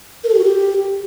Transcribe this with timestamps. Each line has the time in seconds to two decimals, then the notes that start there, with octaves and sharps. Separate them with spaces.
0.24 A#4
0.29 A4
0.34 G4
0.39 F#4
0.44 G4